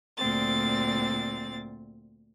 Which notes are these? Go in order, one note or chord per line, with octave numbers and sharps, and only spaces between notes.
D2 A#2 C4 A6